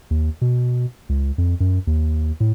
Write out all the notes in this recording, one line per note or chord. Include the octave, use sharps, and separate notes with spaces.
D#2
B2
C#2
F2
F#2
D#2
A2